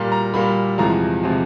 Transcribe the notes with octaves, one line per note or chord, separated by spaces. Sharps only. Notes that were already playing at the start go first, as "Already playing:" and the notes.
Already playing: A#2 G3 A#3
A#5
A#2 G3 A#3 B5
E2 C3 F3 G#3 A#5
C3 F3 G#3